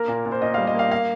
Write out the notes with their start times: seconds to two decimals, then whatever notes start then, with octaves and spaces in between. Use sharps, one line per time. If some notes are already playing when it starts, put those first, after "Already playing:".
Already playing: A#3 A#4
0.08 A#2
0.26 A#2
0.32 C5
0.42 A#2 D#5
0.54 G3 F5
0.67 D#5
0.75 A#3 F5
0.91 A#3 F5